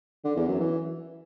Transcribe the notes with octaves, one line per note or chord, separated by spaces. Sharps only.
D3
E2
F#2
E3